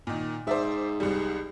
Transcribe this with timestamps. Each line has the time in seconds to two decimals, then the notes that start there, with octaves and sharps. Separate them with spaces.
0.07 A#2 D#3
0.47 G#2 C5 D5 E5
1.00 C2 G3